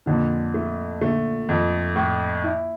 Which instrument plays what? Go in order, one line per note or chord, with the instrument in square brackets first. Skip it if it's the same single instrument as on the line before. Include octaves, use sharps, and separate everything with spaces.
[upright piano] F2 [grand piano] A#2 D3
[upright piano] A3
[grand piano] A#2 D3 [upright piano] A3
[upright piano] F2
A2
E4